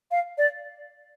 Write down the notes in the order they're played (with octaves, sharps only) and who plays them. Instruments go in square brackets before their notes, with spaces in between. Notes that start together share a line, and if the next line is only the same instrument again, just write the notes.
[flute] F5
D5